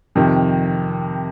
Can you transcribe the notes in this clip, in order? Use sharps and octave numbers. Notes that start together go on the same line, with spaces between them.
F2 C3 D#3